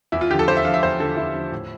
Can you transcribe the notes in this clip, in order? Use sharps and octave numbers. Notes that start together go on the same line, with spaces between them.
E2 E4
F4
D3 F3 G4
A4
E2 C5
E5
D3 F3 F5
E5
E2 C5
D3 F3 A4
E2 E4
D3 F3
A2